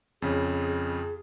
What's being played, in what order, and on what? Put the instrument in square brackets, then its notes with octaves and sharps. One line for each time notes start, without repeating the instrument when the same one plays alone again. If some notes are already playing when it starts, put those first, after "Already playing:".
[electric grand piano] F2 C#3 [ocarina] G#4